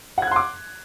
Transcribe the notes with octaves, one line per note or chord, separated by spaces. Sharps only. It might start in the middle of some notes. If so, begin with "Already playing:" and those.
F#5 C6 D6 F#6 G#6